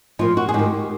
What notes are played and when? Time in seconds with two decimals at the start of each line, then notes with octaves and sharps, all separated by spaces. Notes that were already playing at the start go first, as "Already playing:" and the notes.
0.19 A#2 F3 F4
0.37 F#4
0.49 G#4
0.54 G#2 D#3 G4